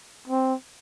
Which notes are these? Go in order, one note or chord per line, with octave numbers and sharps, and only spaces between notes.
C4